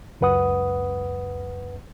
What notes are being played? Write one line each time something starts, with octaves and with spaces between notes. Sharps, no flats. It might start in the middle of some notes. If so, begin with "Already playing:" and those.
C#2 F#2 B4 F#5 D#6